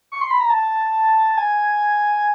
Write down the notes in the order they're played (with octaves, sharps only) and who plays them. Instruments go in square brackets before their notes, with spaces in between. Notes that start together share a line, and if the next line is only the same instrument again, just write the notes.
[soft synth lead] C#6
C6
B5
A#5
A5
G#5